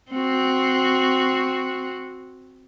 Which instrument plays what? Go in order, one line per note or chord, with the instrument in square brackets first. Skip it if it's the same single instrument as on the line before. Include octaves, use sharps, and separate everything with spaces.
[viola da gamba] C4 F#4